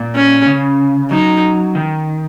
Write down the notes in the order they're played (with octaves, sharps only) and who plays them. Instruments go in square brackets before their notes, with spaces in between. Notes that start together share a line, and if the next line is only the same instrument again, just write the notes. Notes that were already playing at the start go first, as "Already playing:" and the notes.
Already playing: [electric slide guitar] A#2
[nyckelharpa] C#4
[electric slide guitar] C#3
[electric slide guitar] F#3 [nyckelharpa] D#4
[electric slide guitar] D#3